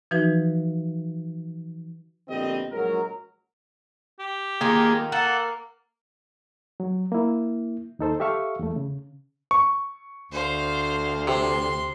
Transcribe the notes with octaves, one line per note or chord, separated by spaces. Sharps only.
E3 F3 D#4 F#4 B4
A#1 B2 D3 C4 G4 D#5
A#1 F#3 G#3 F#4 A#4
G4
D#3 A#3 F4 G#4
A#3 A4 F#5
F#3
A#3 E4
D#2 D#4 A4 C5
G4 A4 E5 F5 C#6
E2 A3
C#3
C#6
D2 C5 F5
C3 C6